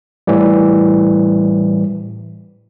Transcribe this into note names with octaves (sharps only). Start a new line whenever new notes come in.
A2 E3 G3